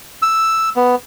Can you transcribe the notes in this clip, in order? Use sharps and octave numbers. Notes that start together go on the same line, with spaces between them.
E6
B3